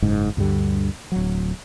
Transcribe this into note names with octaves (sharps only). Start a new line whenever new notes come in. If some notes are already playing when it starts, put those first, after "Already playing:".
F#1 G#2
D2 G2 D3 G3
D1 F#3